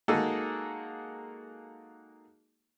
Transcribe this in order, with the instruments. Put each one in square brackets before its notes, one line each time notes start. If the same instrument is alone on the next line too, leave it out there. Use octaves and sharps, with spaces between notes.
[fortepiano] G#3 A#3 D#4 F#4 G#4 A4